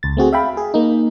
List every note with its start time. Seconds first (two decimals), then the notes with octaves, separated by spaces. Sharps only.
0.03 C#2 A6
0.17 A3 C4 F#4 G#4
0.33 E5 F5 G5 B5
0.57 G#4
0.74 A#3 D#4